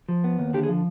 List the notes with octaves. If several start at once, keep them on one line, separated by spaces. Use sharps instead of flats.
F3
B3
D#2
D3 G4
G#4
F3